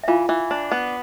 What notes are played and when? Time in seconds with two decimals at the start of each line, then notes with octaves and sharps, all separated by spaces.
0.04 E5
0.08 E3 F4 F5
0.29 E3
0.51 D4
0.72 B3